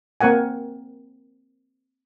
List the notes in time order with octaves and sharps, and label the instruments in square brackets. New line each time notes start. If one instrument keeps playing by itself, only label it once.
[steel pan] A#3 C4 A#4 F#5 G#5